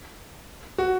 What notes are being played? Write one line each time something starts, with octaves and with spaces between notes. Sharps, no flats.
F#4